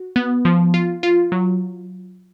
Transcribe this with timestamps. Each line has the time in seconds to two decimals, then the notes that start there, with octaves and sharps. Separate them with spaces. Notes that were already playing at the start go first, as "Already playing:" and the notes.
Already playing: F#4
0.16 B3
0.45 F3
0.74 F4
1.03 F4
1.32 F#3